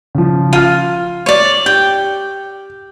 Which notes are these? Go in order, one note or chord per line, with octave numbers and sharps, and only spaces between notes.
C#3 F3
F4 F6 D#7
C#5 D5
G4 G5